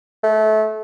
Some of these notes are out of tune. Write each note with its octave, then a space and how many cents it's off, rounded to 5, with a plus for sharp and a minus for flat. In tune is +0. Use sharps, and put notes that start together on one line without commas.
A3 -25